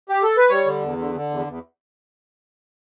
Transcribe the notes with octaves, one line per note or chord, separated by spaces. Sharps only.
G4
A4
B4
G3 C#5
D3
E2
D3
D3
E2
E2